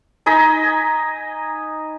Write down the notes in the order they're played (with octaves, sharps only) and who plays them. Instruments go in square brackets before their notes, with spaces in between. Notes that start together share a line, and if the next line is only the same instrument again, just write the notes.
[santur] D#4 D#5 G#5 B5